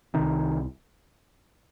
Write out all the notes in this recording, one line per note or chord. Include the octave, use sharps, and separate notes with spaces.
C3 D#3
C2